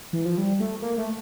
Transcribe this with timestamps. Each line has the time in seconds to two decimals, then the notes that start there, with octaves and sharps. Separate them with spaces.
0.13 E3
0.25 F3
0.38 G3
0.60 A3
0.82 A#3
0.98 A3